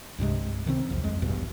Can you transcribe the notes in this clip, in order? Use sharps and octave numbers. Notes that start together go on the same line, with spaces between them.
C2 G2 C3 G#3
C3 D#3 G3 C4
B1 E2 F3
F2 G#3
A#1 E2 G2 B2